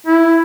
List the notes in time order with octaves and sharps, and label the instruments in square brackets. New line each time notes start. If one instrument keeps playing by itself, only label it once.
[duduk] E4